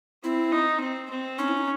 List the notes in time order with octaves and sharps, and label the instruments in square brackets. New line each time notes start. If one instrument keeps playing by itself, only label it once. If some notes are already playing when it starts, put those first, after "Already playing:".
[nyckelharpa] C4 [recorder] E4
[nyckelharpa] D#4
C4
C4
[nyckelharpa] C#4 [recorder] D#4
[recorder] E4
D#4